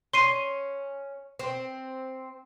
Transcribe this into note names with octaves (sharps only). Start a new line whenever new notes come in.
C#4 C6 C7 D#7
C4